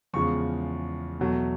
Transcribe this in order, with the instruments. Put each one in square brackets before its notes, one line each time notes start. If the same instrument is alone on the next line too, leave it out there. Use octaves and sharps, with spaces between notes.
[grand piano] E2 C#3 F3 G#3 C#6
E2 B2 F#3 A3